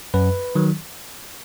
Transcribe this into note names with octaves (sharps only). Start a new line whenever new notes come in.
F#2 B4
D#3 F#3